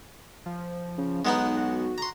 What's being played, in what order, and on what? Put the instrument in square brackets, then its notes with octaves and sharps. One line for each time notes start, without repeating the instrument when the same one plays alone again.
[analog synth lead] F3
[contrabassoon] C#3
[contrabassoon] B1 [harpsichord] G#3 B3 D#4 [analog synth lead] F#5
[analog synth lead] F#4
[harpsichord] A#5 C6